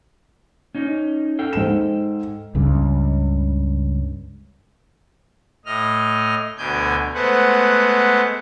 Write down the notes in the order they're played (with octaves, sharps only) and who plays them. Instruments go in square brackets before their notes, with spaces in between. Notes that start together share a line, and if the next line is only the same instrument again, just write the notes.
[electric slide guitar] C#4 D#4
A4 F5 G5
[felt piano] G#2 E7
[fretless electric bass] C#2 G2 C#3
[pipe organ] A2 D#5 F6
D2 B2 D3 G#5 G6
G#3 A3 B3 B4 C5 F#5